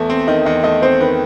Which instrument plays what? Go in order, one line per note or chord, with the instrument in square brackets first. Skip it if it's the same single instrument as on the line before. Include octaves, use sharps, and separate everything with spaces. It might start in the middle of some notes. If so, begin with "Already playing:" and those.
Already playing: [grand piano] E2 A3
C4
[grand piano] D#3 [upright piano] D#5
[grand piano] E2 [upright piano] D#5
[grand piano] A3 [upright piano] D#5
[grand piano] C4 [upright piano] C5
[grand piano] D#3 [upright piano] B4